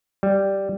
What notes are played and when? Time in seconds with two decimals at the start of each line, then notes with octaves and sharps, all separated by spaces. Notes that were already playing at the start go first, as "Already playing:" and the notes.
0.23 G3